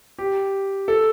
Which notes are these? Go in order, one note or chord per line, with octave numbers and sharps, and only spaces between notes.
G4
A4